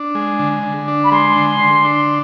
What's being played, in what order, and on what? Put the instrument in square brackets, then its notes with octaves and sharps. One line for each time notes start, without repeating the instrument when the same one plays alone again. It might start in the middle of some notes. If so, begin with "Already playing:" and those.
Already playing: [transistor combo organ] D4
G#3
D3
D3
D4
[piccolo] B5
[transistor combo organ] G#3 [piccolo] C6
[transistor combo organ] D3
D3
D4